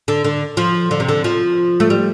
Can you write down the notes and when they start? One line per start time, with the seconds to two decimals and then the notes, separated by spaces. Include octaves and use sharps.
0.08 D3
0.24 D3
0.57 F3
0.91 D3
1.00 C3
1.09 D3
1.24 F3
1.80 A3
1.90 G3